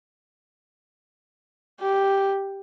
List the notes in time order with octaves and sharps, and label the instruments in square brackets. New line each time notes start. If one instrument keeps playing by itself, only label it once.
[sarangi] G4